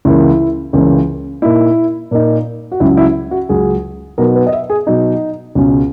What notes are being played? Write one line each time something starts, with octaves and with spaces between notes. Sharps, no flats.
C#2 C#3 E3 A#3 E4
C#2 C#3 E3 A#3
A#2 A#3 D#4 E4
A#2 A#3 D#4
F#4
C#2 C#3 F#3 E4
E4
F#4
C#2 C#3 F#3 G#4
B2 F#3 B3 D#4 A#4
B4
D#5
E5
G#4
B2 F#3 B3 D#4
C#2 B2 G#3 C#4